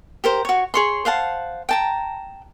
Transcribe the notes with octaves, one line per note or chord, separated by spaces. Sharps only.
G4 A#4 C5
F#4 C#5
G#4 C#5 C6
C5 F5 F#5 A5
G5 A5 A#5